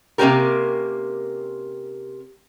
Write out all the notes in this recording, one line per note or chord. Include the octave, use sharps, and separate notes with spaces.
C3 A#3 C4 C#4 G4 A#4